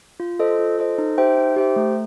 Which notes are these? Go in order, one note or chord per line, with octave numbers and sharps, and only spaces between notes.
F4
A4 C5 D#5
F4
A4 C5 D#5
D#4
G4 C5 E5 G5
D#4
G4 C5 E5 G5
A3